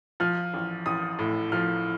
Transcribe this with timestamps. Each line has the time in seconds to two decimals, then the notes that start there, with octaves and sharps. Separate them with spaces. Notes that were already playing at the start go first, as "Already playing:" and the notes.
0.20 F3 F6
0.54 A1
0.86 A1 D#6
1.19 A2
1.52 F3 F6